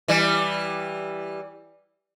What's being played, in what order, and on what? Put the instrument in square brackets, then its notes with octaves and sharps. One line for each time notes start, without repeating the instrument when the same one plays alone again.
[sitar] E3 G3